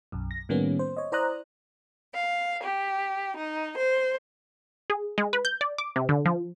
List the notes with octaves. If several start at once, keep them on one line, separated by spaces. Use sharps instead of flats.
B1 F#2
A#6
A2 D#3 G3 A#3 B3 C#4
C5
C#5 D#5
E4 C5 D5 A#5 D#6 F#6
F5
G4
D#4
C5
G#4
G#3
B4
G6
D5
D6
C3
D3
F3